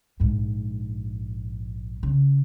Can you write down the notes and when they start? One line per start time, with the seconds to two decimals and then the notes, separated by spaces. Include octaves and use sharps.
0.20 A#1 G#2
2.03 C#3